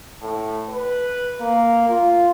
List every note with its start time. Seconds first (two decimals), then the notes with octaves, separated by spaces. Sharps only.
0.22 A2
0.70 B4
1.41 A#3
1.89 F4